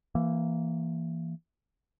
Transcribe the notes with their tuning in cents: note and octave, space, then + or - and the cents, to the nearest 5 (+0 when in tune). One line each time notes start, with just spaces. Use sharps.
E3 +20 A#3 +0